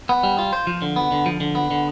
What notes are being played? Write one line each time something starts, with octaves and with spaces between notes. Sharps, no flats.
B3
G3
F4
C5
F3
D3
B3
D3
F3
D3
B3
D3